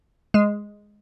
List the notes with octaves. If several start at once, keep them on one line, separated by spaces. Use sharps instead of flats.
G#3